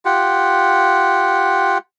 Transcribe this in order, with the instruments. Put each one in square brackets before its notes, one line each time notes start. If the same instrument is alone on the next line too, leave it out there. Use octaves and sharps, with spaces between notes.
[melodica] F4 G4 F#5